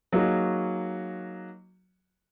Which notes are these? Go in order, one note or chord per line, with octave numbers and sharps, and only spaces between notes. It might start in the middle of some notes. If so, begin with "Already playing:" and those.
F#3 A#3 D#4 F#4 G#4